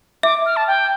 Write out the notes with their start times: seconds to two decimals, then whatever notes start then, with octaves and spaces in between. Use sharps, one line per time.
0.23 E5 D6
0.46 F6
0.56 A5
0.67 G5